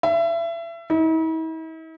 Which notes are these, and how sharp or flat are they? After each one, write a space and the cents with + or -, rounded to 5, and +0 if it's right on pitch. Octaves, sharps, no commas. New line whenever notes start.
E5 +30
E4 -45